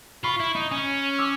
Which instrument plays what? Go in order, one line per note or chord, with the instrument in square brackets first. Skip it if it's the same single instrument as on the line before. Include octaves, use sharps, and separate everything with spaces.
[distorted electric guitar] F4 [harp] B5 C#6
[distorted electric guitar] E4
D#4
C#4
[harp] D6 E6